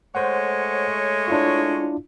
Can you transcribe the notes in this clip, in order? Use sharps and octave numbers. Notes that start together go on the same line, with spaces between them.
G#3 A3 C5 C#5 F#5
D4 E4 F4